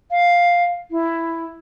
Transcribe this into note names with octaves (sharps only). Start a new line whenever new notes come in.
F5
E4